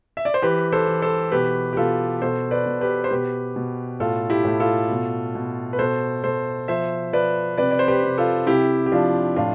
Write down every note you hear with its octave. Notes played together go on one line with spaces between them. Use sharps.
E5
D5
C5
E3 G4 B4
A4 C5
E3
A4 C5
B2 G4 B4
G4
B2 F4 A4
B2 A4 C5
B4 D5
B2
G4 B4
C5
B2 G4 B4
B2
A2 F4 A4
E4 G4
A2
F4 A4
B2
B2
B4
B2 A4 C5
B2 A4 C5
F3 C5 E5
F3 B4 D5
C3 B4 D5
D5
C5
G4 B4
C3
F4 A4
C3 E4 G4
G4
F3 D4 F4
A2 D4 F4